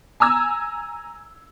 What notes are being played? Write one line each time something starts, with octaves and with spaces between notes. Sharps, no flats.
G#5 A#5 E6 G#6